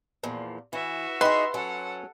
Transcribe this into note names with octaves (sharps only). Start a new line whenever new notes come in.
E2 A#2 F3
E3 F#4 E5
D#4 G#4 B4 C6
F#3 C#4 A4 F#5